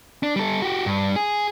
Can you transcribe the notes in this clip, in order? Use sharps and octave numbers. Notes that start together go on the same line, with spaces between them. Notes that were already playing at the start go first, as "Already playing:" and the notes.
D4
G3 A4
F#4 G4
G2
G#4